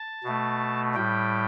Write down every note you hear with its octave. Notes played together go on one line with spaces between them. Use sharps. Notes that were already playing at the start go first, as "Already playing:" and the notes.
Already playing: A5
B2 A3
A2 G3 G5